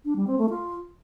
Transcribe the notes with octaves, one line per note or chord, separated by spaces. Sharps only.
D4
G3
C4
A3
F4